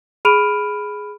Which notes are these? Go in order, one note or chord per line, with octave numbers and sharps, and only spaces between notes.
G#4 B5 F6 D7 D#7 F7